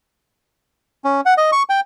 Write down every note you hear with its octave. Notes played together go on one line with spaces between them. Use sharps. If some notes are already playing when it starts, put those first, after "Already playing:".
C#4
F#5
D#5
C#6
G5